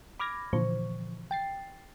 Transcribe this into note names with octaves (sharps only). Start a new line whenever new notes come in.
B5 D6 F6 G#6 A#6
A#2 D3 E3 F3 C5 C#6
G5 A6 C7